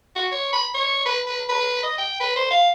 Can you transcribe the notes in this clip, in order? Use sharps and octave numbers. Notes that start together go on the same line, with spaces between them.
F#4
C#5
B5
C#5
B4
B4
B4
D#5
G5
B4
C5
F5